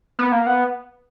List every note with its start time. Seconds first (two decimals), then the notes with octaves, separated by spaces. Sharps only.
0.19 B3
0.32 A#3
0.47 B3